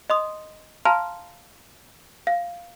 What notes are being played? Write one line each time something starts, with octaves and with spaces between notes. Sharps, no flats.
D#5 C6 D#6
F5 A5 A#5 C6 F6
F5